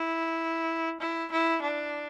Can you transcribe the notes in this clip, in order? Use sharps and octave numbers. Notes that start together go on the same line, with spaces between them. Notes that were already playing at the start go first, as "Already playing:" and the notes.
Already playing: E4
E4
E4
D4